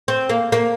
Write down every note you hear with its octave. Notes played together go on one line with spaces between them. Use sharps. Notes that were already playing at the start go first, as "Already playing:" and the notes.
C4
A#3
A#3